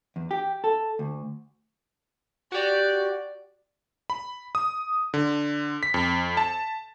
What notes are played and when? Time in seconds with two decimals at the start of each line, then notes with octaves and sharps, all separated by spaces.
0.16 E2
0.31 G4
0.64 A4
0.99 D2
2.52 F#4 G4 D5
4.10 B5
4.55 D#6
5.14 D3
5.83 B6
5.94 F2
6.37 A5